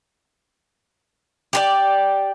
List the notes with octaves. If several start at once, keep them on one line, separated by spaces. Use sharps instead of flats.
G4 G#4 D5